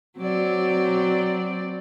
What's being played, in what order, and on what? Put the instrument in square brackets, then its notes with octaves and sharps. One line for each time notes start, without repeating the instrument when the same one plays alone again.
[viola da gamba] F#3 C4 D5